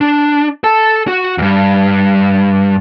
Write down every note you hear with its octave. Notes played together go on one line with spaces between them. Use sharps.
D4
A4 A5
F#4
E2 G2